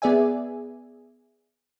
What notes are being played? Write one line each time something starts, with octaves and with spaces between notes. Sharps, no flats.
B3 G#4 D5 E5 G#5